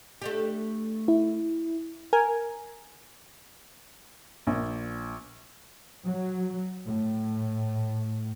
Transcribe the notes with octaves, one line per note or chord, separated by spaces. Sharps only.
A3 D4 G4
E4
A#4 G#5
A#1
F#3
A2